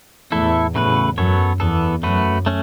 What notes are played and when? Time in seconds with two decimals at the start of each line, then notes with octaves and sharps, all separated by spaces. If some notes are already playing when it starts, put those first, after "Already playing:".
0.32 E2 A2 A3 E4 A4
0.74 E2 A2 C#3 A3 F#4 B4
1.18 F#2 F#3 B3 A4 C#5
1.60 E2 E3 B3 A4
2.03 F#2 A3 F#4 B4
2.46 A3 C#4